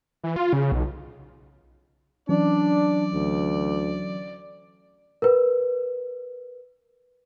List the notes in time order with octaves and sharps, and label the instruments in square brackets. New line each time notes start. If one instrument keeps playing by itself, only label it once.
[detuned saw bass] E3
F4
C#3
B1
[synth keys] E3 F#3 C#4 [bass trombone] D4 [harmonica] D5
[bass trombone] D2
[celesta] A#4 B4